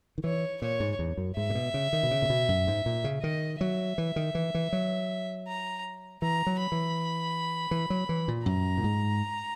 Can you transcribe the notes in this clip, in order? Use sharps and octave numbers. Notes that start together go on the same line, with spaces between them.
D#3
E3 C#5
A#2 C#5
G#2
E2
F#2
G#2 E5
A#2
B2
C#3
D#3
B2
C#3
A#2
B2
F#2
G#2
A#2
C#3
D#3 D#5
F#3 E5
E3
D#3
E3
E3
F#3
A#5
E3 A#5
F#3
B5
E3
E3
F#3
E3
A#2
F#2 A#5
A#2
G#2